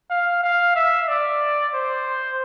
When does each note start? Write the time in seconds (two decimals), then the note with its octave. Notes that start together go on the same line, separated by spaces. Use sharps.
0.10 F5
0.43 F5
0.76 E5
1.08 D5
1.74 C5